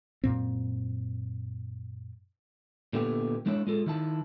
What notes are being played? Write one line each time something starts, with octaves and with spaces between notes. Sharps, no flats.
F#2 A#2 C4
A#2 D3 A3 B3 G4
G#3 A3 D4 E4 C#5
G#3 F4 A4
D#3 E4 A5